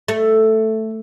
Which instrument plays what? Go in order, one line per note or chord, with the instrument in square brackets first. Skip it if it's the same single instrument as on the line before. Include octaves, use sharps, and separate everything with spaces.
[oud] A3